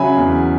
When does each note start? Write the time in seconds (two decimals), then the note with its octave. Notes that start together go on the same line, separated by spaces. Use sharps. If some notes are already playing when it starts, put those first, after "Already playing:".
Already playing: C#3 F#3 E5 G#5 B5
0.17 E2